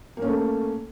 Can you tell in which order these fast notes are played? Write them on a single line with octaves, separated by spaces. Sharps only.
A#3 C#4 A3